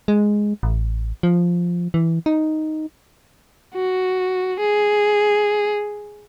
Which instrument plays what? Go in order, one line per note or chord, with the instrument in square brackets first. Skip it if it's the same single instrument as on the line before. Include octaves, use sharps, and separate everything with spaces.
[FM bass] G#3
A1
F3
E3
D#4
[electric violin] F#4
G#4